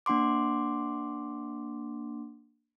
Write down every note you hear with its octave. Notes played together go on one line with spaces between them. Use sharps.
A#3 D4 F#5 C6 D6